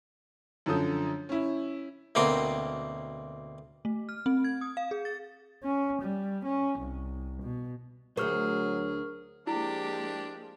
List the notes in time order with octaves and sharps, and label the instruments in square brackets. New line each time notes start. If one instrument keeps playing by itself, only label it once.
[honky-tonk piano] F#2 D3 F3 A4 D#6 G6
C#4 E4
[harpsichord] D2 B2 A#3 C4 G5
[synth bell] A3
F6
C4
G#6
D#6
F5
G#4
A6
[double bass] C#4
G3
C#4
C2
B2
[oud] D2 C5 [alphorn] F#3 [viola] G#4 [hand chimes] A#4 C#6 F6
[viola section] F3 G#3 A#3 [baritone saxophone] D4 [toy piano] E4 [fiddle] G4